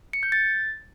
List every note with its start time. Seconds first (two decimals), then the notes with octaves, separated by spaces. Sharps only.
0.13 C#7
0.23 G6
0.32 A6